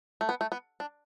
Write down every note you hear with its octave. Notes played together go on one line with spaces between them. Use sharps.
A3
B3
A3
B3
D4